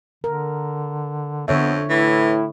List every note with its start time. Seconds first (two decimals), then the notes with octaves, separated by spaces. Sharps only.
0.24 D3 A#4
1.48 F2 D3 B3 C#5 E5
1.90 A2 E3 E4